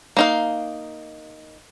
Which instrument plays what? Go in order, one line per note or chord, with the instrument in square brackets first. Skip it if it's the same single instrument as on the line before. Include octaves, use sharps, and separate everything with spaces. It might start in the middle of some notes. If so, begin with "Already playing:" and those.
[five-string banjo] A#3 D#4 F5